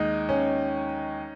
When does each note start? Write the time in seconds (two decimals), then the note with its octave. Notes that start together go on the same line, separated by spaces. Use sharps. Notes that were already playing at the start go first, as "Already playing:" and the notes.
Already playing: D#2 G#3 D#4
0.29 C#4